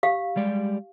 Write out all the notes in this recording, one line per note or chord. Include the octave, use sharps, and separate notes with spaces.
G4 F5
G3 G#3 D5